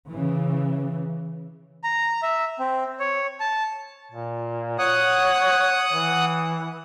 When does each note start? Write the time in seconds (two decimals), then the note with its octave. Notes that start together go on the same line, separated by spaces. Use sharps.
0.11 C#3 E3
1.84 A#5
2.22 E5
2.59 C4
3.00 C#5
3.40 A5
4.11 A#2
4.79 C#5 F#5 D#6 F#6
5.92 E3